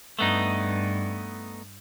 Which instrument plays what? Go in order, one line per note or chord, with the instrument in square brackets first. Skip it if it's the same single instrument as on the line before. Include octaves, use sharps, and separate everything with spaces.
[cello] G2 [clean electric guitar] A3 B3 D#4